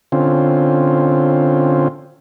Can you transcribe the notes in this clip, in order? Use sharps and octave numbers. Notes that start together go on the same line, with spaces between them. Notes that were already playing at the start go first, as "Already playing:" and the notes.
D3 C4 C#4 F4